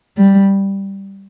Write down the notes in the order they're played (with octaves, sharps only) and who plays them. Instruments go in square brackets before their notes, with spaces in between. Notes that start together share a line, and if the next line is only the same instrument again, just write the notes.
[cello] G3